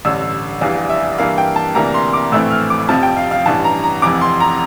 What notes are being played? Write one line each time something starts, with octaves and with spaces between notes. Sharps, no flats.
A1 G2 D3 E6
F1 E2 E3 G3 D4 F5
E5
G2 E3 A#3 E4 F5
G5
A5
D2 C3 E3 A#3 D4 A#5
C6
D6
A#1 A2 E3 A3 C4 E6
F6
D6
F1 F2 C3 F3 A5
G5
F5
F5
A1 G2 E3 A5
A#5
A#5
F1 F2 E3 D6
C6
A#5